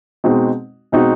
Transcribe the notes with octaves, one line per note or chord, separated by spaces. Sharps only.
B2 G#3 C4 D#4 F#4
B2 G#3 C4 D#4 F#4